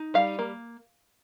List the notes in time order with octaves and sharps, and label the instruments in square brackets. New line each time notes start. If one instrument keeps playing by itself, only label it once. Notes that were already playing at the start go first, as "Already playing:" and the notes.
Already playing: [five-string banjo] D#4
G3 F5
A#3